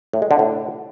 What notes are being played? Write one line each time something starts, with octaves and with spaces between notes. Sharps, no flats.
A2
G#3
D3
A2